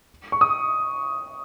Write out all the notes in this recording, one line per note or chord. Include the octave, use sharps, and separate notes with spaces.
C#6
D#6